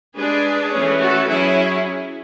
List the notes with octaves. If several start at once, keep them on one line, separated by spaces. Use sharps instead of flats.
G#3 D4 G#4 B4
E3 A3 C#4
F#4 A4
F#3 C#4 E4 G#4